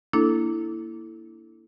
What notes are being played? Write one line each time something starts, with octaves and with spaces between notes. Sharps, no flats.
A#3 D4 E4 A4